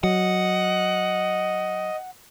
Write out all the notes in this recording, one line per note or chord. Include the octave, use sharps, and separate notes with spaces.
F#3 D#5 F#5